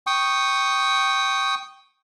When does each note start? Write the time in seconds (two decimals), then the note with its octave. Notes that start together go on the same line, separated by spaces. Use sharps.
0.07 G5 C#6 D#6